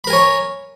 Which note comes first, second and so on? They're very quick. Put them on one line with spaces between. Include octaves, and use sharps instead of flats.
B5 A#4 G#5 C#5